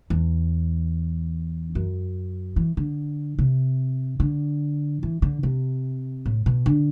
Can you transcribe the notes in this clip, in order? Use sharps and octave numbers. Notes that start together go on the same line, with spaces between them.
E2
F#2
E3
D3
C3
D3
E3
D3
C3
A2
B2
D3